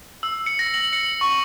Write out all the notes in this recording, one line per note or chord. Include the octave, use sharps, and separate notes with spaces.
E6
C#7
A#6
F#7
C#7
C#6